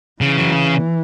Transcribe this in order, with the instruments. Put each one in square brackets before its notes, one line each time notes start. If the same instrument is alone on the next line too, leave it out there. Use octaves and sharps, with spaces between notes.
[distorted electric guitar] C#3 [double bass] E3
[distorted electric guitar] F#3